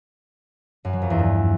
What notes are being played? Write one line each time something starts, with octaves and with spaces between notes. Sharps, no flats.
F#2
F#3
F2
E2
G2